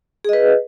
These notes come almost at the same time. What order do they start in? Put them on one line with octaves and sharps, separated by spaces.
G#4 D#5 B4